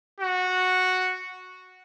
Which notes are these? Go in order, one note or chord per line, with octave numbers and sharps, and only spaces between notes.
F#4